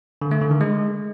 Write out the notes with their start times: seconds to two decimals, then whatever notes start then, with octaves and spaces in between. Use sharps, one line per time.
0.22 D3
0.31 A3
0.41 D3
0.51 D#3
0.61 G#3